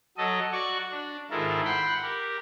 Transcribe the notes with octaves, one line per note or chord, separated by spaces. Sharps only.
F#3 A4 D#5
F#4 D5 C#6
D4
G#2 D#3 E4 F4 A4 A#4
F#5 G5 B5 C6
G4 A#4